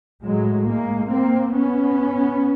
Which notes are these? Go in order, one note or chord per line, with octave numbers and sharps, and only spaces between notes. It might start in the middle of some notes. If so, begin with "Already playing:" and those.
A2 F#3 G#3
G#3 A#3
A#3 C4
B3 C#4